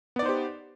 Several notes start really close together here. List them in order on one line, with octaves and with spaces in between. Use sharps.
B3 D5 D#4 C5 G4